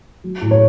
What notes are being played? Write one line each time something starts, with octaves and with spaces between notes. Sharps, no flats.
F#3
A2
C#5